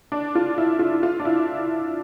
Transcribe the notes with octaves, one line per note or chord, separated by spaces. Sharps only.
D4
F4
E4
F4
F4
D4
E4